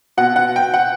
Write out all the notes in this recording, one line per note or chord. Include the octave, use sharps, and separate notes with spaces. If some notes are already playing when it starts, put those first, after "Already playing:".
B2 F#5
F#5
G5
F#5